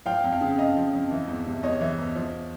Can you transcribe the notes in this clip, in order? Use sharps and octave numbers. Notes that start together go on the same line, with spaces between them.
F3 F5 G5
F2
F5 G5
C#3
F2 D#5 F5
F3
F2
E3
E2
C3
E2 C#5 D#5
E3
E2
F3